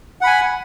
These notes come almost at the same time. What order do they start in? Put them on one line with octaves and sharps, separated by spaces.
F#5 B5 G#5